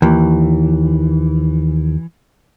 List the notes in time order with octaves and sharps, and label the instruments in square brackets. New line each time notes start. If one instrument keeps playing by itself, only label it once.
[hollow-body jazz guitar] D#2 [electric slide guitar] E3